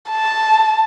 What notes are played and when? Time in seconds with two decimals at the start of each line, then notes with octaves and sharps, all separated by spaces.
0.10 A5